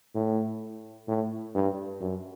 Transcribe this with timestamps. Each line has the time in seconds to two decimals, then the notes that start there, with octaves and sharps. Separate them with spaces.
0.15 A2
1.08 A2
1.55 G2
2.01 F#2